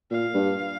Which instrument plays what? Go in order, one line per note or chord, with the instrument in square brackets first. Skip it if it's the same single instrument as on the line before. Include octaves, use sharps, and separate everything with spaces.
[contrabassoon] A#2 [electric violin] F5
[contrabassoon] G2